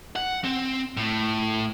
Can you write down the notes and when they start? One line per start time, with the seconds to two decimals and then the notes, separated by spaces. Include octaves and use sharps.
0.16 F#5
0.44 C4
0.97 A2